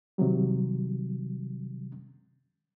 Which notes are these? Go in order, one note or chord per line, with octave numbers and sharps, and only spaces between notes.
C3 D#3 F#3 G3